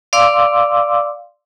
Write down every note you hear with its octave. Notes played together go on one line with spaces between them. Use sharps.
D5 F5 C6 D6 E6